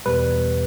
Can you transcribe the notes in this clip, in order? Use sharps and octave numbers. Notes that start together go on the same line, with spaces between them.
E2 B2 G3 B4